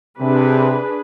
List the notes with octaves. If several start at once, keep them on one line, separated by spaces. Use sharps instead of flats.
C3 D4 G#4 B4